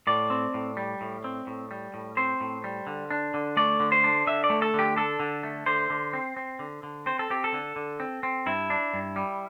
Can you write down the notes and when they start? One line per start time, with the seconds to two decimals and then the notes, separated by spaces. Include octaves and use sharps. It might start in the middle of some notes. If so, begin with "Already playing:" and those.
0.07 A2 D5
0.30 C4
0.54 A2
0.77 G3
1.01 A2
1.24 C4
1.47 A2
1.71 G3
1.94 A2
2.17 C4 C5
2.41 A2
2.64 G3
2.87 D3
3.11 D4
3.34 D3
3.57 A3 D5
3.80 D3
3.92 C5
4.04 D4
4.27 D3 E5
4.44 D5
4.50 A3
4.62 A4
4.74 D3 G4
4.97 D4 A4
5.20 D3
5.43 A3
5.66 D3 C5
5.90 D3
6.13 C4
6.37 C4
6.59 D3
6.83 D3
7.06 C4 C5
7.19 A4
7.30 C4 G4
7.44 A4
7.54 D3
7.76 D3
8.00 C4
8.23 C4
8.46 G2 E4
8.70 D4
8.93 G2
9.16 G3